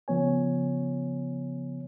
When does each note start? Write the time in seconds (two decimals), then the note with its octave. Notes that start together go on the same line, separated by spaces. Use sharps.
0.08 C#3 F3 B3 C#5 G#5